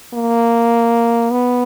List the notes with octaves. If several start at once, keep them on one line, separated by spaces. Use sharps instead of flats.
A#3
B3